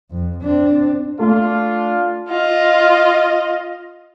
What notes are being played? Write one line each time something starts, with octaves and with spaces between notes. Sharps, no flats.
F2
C4 D4
A3 D4 F4
F4 D#5